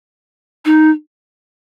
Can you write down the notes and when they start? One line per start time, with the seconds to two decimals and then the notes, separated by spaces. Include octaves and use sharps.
0.65 D#4